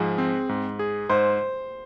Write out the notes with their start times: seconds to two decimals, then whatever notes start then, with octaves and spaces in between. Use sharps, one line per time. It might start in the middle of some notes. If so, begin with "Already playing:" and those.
Already playing: G#2 F3 G#4
0.18 C4
0.49 G#2
0.79 G#4
1.09 G#2 C5